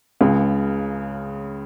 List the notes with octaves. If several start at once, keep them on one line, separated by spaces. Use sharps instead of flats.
C#2 C#3